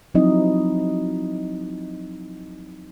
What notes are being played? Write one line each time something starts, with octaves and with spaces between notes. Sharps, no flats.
F3 F#3 C4 D#4 E4 D#5